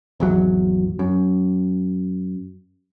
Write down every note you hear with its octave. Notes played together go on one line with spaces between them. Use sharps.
G#1 E2 F#3
F#2